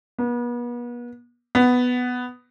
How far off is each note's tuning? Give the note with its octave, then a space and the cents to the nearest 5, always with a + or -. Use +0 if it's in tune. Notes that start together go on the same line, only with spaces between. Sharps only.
B3 -40
B3 +5